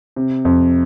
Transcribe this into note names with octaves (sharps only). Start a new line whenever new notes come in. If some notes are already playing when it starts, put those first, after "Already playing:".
C3
F2